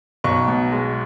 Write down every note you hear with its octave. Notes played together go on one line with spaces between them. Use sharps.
B1 C#6
B2
G#3